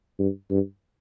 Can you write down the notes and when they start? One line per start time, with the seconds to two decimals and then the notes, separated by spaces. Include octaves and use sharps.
0.19 G2
0.50 G2